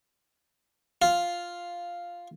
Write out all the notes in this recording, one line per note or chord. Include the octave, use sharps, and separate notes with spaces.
F4